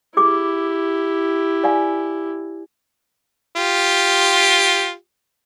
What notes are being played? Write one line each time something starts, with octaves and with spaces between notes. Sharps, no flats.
E4 G4 G#4 D6
D5 F5 G#5
F4 G4